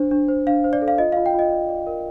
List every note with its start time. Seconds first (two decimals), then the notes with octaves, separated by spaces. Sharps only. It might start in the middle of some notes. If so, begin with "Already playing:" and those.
Already playing: D4 C5
0.11 D4
0.28 C5
0.47 D4 F5
0.64 C5
0.73 D5
0.82 A4
0.88 F5
0.98 F4 D#5
1.12 F5
1.17 F4
1.26 G5
1.34 F4 D#5
1.51 D5
1.69 D5
1.87 A#4